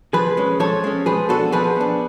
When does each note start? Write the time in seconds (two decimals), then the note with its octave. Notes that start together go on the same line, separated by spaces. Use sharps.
0.13 F3 G#4 B4
0.37 G#3 C#4
0.60 F3 A4 C#5
0.84 G#3 C#4
1.06 F3 G#4 B4
1.29 B3 D4 F#4 A4
1.52 F3 G#4 B4
1.76 B3 D4